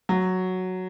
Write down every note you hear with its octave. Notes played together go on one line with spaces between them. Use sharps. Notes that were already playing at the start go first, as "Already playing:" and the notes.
F#3